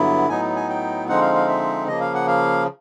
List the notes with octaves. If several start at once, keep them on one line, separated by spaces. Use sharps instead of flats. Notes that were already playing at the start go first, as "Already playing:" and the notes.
Already playing: G2 D3 F#3 B3 E4
A2 F#3 B3 D#4 G#5
G#5
G5
D3 F3 G#3 C4 D#4 F#5
F5
F5
E5
C#3 F3 A#3 D#5
F5
F#5
F5